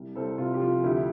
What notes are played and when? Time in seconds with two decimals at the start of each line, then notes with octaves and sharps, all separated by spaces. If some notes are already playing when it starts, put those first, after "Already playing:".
Already playing: C2
0.16 C2 A4 C5
0.38 C3 F4
0.54 G4
0.61 F3 F4
0.84 D2 E4 G4